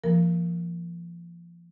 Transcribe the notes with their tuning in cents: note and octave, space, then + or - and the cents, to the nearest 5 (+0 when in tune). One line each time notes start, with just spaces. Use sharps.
F3 -35 A#3 +0 A#4 -10